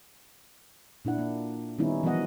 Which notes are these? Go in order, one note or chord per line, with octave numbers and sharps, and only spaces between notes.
A#2 D4 E4 F#5
A#3
D#3 G3 B3 C#4 D#4 E4
E3 F3 G3 B3 D#5 F#5